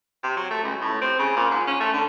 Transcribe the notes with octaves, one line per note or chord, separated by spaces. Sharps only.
C3
F#3
A3
C#2
A2
C4
C#3
A#2
G#2
C#4
A3
D3